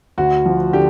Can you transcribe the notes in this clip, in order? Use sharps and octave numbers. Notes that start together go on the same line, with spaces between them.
D2 F#4
F3
D3 G4